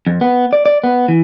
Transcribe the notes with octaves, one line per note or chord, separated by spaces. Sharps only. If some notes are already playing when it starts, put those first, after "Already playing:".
F2
B3
D5
D5
B3
E3